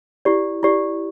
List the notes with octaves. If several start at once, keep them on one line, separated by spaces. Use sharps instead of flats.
E4 G4 D5
E4 G4 D5